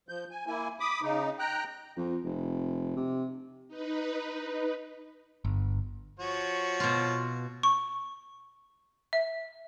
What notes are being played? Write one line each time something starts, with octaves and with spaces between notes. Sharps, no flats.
F3 G6
G#5
A#3 E4 G#5
B5 D6 D#6
C#3 D#4
G5 A#5 F#6
F2
F1
C3
D#4 B4
G1
F3 F#4 C#5
B2 F4
C#6
E5